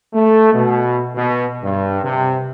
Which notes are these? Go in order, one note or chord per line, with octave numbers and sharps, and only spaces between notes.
A3
B2
B2
G2
C3